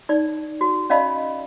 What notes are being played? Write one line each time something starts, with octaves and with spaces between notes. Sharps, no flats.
D#4 D5
F#4
C#4 D5 D#5 F5 A5 B5